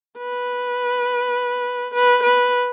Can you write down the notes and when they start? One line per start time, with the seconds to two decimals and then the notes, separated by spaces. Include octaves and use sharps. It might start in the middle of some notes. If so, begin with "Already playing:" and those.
0.18 B4
1.94 B4
2.24 B4